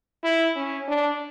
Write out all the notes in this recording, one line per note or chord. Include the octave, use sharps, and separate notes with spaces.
E4
C#4
D4